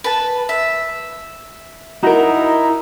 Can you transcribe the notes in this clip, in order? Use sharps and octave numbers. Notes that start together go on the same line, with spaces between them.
B4 A5
E5
D#4 E4 F#4 A#4